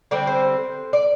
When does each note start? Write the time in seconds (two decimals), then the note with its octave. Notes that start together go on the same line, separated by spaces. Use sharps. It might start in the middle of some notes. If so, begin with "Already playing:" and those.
0.11 D3 G3 C4 D5
0.27 C5
0.93 D5